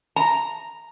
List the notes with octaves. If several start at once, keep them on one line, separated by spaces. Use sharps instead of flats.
A#5